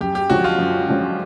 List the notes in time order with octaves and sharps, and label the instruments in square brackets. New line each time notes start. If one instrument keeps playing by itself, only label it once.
[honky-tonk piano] F#2 [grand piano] G4
[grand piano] G4
[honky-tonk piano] D3 F3 G#3 C#4 [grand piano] F#4
[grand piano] F4
[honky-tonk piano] F#2
D3 F3 G#3 C#4